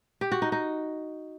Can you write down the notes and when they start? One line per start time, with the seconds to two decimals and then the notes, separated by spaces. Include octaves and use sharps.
0.21 G4
0.32 F#4
0.42 D#4
0.52 D#4